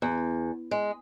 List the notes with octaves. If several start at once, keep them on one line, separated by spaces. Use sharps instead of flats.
E2
G#3